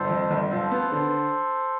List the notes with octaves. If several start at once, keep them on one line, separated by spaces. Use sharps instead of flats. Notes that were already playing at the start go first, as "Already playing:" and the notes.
Already playing: G1 A4 C5
F2
G1
F3 A4 C5
B3
D3